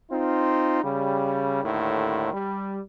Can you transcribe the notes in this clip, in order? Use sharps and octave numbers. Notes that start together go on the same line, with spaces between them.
C4 D#4 F4
C#3 G3
D#2 A2 D3 D#3
G3